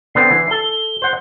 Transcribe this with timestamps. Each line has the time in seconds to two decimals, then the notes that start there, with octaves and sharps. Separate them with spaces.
0.15 D3 B3 C4 C7
0.31 E3
0.51 A4 G7
1.02 C5 F#5